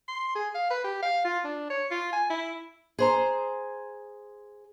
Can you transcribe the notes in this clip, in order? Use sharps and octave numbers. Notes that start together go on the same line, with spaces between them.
C6
G#4
F5
B4
G4
F5
F4
D4
C#5
F4
G#5
E4
G#4 C5 A#5